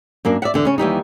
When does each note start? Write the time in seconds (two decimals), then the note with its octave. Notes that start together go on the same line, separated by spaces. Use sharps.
0.25 F#2 A#3 D4
0.42 D5 E5 F#5
0.54 E2 D3
0.65 C#3 C#4
0.78 D#2 E3 G3 D#4